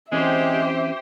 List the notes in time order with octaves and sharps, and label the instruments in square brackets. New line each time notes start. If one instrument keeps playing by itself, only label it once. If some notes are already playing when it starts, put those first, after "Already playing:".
[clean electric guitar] E3 C4 C#4 [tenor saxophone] G#3 [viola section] G4 C5 [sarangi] E5